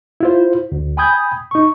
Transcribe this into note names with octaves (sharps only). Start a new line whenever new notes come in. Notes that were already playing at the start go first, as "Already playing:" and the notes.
E4 F4 C5
D2
G5 G#5 B5 D#6 G6 G#6
D#4 C#6